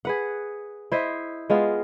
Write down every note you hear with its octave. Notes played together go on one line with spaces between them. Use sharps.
G#4 B4 F#5
E4 C5 D#5
G#3 B3 F4 F5